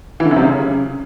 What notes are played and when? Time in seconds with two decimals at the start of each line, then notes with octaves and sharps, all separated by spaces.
0.20 E3
0.25 D3
0.31 F#2
0.36 C3
0.42 C#3